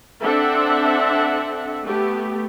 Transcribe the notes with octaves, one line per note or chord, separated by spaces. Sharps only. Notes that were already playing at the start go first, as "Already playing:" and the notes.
C4 D4 A4 E5 F#5
A3 B3 G4